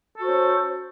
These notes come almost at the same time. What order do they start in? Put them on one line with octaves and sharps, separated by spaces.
A4 F#4 C5 C#4